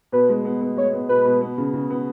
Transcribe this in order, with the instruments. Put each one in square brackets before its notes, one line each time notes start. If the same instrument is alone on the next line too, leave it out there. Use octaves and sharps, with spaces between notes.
[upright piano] B2 [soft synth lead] B4
[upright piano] G#3
B3
B3
[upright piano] G#3 [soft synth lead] C#5
[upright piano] B3
[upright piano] B2 [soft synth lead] B4
[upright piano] B2
B3
C#3
C#3
B3